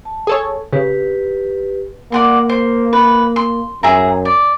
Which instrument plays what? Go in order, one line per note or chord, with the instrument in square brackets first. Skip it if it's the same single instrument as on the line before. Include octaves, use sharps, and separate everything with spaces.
[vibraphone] A5
[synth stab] G#4 A4 C#5
[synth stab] C#3 [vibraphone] G4 B4
[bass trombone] A#3 [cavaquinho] D5 F#5 C6
[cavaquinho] C5
B4
C6
[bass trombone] F#2 [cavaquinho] G#4 E5 A#5
[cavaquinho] D5